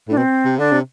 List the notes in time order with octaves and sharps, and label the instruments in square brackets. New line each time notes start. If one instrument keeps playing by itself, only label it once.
[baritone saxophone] A2 [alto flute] D4
[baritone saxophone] B2 [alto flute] C4
[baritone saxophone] C3
[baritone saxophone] D3 [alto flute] D4
[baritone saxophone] C3